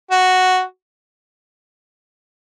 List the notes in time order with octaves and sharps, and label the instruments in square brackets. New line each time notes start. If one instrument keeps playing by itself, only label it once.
[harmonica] F#4